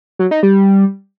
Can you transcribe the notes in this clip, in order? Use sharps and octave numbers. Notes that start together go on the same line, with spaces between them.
F#3
D#4
G3